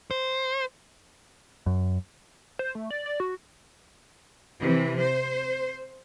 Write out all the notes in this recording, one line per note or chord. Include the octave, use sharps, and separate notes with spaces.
C5
F#2
C5
A3
D5
D5
F#4
C3 E3
C5